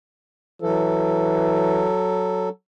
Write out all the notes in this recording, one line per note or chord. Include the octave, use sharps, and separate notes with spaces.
E3 F#3 A4